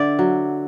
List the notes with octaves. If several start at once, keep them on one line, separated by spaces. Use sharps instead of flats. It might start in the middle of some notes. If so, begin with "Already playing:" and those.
Already playing: D3 D5 E5
F#3